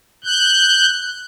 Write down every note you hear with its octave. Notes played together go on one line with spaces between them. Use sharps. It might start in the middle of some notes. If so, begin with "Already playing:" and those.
F#6 G6